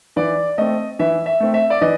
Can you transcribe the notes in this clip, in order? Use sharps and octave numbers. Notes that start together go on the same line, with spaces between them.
E3 D5
A3 C4 D#5
E3 E5
E5
A3 C4
E5
D5
E3 D#5